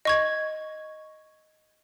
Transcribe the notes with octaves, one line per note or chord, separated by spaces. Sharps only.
D#5 C#6 G#6